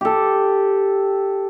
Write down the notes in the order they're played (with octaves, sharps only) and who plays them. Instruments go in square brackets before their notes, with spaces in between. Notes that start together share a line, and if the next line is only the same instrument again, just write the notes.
[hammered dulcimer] G4 A4